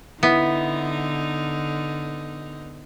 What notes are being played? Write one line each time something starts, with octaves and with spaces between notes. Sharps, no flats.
D3 B3 D#4 E4